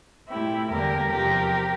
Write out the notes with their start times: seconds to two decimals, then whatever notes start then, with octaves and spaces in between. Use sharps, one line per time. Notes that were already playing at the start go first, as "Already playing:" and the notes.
0.29 A#2 A3 C4 E4 G4
0.70 E2 D3 G3 A#3 D4 G4 A#4
1.11 E2 C3 F3 C4 G4 A#4